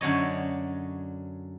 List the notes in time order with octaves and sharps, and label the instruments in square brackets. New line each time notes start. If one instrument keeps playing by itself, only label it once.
[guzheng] F#2 D3 C#5 D#5